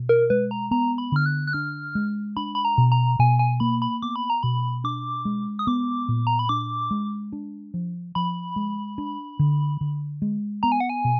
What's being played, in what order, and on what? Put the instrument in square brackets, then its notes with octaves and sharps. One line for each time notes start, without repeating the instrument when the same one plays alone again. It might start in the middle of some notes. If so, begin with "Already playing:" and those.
Already playing: [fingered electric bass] B2
[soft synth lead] A#4
[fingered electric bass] G#3 [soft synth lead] B4
[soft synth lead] A#5
[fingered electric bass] B3 [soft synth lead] A#5
[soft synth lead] B5
[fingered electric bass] D3 [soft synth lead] F6
[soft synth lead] F#6
F#6
[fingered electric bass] D4 [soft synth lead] F6
[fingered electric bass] G#3
[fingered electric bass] D4 [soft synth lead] B5
[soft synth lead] B5
A#5
[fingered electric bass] B2
[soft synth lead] A#5
[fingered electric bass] B2 [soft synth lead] G#5
[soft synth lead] G#5
[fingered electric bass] A#3 [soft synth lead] B5
[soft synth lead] B5
[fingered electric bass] B3 [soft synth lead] D6
[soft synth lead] B5
A#5
[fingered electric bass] B2 [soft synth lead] B5
[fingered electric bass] D4 [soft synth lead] D6
[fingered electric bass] G#3
[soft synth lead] D#6
[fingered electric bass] B3 [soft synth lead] D6
[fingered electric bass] A#2
[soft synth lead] A#5
B5
[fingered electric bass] D4 [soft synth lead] D6
[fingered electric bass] G#3
D4
F3
[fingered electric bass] F3 [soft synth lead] B5
[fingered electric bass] G#3
D4
D3
D3
G#3
[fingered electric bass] B3 [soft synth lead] A#5
[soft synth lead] G#5
F#5
G#5
[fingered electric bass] B2